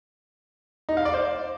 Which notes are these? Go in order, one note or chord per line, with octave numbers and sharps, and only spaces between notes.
D#4
F5
D5
C5